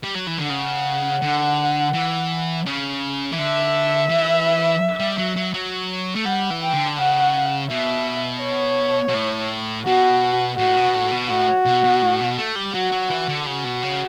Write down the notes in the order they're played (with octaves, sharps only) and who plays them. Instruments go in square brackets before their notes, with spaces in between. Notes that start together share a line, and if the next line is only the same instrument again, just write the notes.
[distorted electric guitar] G3
F#3
E3
D3
[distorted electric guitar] C#3 [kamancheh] F#5
[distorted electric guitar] D3
E3
C#3
E3
[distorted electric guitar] D3 [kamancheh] E5
[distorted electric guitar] E3
G3
F#3
F#3
F#3
A3
[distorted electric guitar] G3 [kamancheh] F#5
[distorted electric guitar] E3
[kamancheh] G5
[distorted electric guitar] D3
[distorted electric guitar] C#3 [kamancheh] F#5
[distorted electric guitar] B2 [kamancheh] E5
[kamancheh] C#5
[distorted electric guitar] B2
A2
[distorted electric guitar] B2 [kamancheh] F#4
[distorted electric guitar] A2 [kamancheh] F#4
[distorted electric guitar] B2
A2
B2
[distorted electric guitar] A2 [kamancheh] F#4
[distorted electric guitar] B2
B2
A2
B2
A3
G3
[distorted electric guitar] F#3 [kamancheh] F#4
[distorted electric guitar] F#3
E3
D3
[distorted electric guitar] C#3 [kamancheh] F#4
[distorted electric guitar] B2
C#3